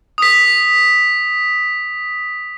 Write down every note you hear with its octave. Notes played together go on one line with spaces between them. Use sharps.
D#6 B6